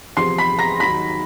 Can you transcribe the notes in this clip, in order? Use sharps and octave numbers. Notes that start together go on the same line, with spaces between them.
E2 C3 F3 C6 C7
B5 B6
A#5 A#6
D#2 D#3 F#3 B5 B6